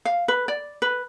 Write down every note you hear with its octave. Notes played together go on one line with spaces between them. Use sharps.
F5
B4
D5
B4